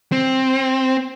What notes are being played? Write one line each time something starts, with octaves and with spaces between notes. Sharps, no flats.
C4